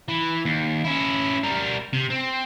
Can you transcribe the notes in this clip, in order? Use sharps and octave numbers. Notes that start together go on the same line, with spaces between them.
E3
D#2
C#4 E4
G3 A#4
C3
C4